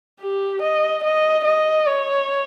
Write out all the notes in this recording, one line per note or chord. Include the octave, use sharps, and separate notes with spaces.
G4
D#5
D#5
D#5
C#5